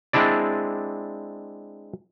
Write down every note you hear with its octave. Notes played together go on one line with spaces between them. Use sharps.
G#3 C4 D4 E4 D5